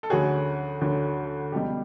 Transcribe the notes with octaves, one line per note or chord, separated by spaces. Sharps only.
A4
D2 D3 F#3 A3 C#4 F#4 G#4
D2 D3 F#3 A3 C#4
C#2 B2 G3 G4 A4